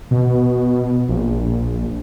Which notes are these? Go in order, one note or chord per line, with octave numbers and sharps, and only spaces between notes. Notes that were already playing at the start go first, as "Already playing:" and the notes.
B2
A#1